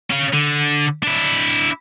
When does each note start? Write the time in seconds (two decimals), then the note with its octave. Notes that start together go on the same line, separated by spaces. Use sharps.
0.11 C#4 F5
0.33 D3
1.03 D4 E4